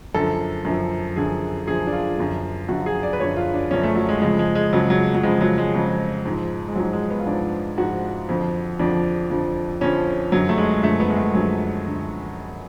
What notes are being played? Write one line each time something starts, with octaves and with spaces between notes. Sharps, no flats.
F#2 D3 F3 A4
F#2 D3 F3
F#2 D3 F3 G#4
F#2 D3 F3 G#4
D4
F4
F#2 D3 F3
F#2 D3 F3 F#4
G#4
D5
B4
F#2 D3 F3 C#5
F4
D4
F#2 D3 F3 C#4
A3
F#3
G#3
F2 C#3 F3 G#3
G#3
G#3
F2 C#3 F3 F#3
F#3
F#3
F2 C#3 F3 G#3
F#3
G#3
F2 C#3 F3
G#2 F3
G#3
G#2 F3 F#3
G#3
B3
F4
G#2 F3 D4
G#2 F3 F#4
F2 D3 F3
F2 D3 F3 D4
F2 D3 F3
F2 D3 F3 C#4
F#2 D3 F3 F#3
A3
G#3
F#2 D3 F3 A3
B3
G#3
A3
F#2 D3 F3 F#3
D3